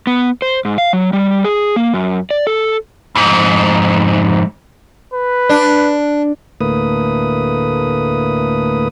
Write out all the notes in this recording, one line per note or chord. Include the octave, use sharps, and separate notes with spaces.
B3
C5
G#2
F5
F#3
G3
G#4
A#3
F#2
D5
A4
F2 G#2
B4
D4
D2 A2 A#3 B4 D#6